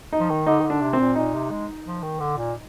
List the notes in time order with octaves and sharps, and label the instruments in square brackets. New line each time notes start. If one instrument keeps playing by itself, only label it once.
[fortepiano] D#4
[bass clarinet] F3
D#3
[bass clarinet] D3 [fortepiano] D#4
[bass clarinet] D#3
D3
[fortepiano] D4
[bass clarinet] C3
[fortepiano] C4
[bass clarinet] A#2
[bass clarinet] A#2 [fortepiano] D#4
[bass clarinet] C3
G#3
F3
D#3
D3
A#2